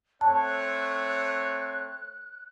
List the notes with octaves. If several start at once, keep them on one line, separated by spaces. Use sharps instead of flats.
A3 C4 C#5 A5 F#6